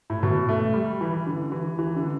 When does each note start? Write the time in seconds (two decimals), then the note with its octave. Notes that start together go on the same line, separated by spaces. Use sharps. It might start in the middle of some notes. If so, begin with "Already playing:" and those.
0.10 A2
0.23 B2
0.49 A3
0.74 G3
1.01 E3
1.27 D3
1.52 E3
1.79 E3
1.96 D3